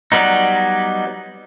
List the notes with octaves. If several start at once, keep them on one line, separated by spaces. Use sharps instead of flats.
F#3 G3 B3 D#4